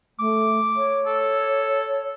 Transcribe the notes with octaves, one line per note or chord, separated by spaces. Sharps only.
A3 D6
C#5
A4